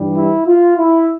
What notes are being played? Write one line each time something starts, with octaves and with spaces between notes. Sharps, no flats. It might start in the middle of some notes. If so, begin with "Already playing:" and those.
Already playing: G2 E3 G3
E4
F4
E4